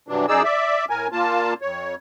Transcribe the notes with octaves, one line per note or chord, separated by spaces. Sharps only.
G2 C3 E3 F#3 D4
F#2 D#4 G#4 D5 E6
D5 E5
A2 A#4 G#5
A#2 A#3 F4 A5
F2 C#5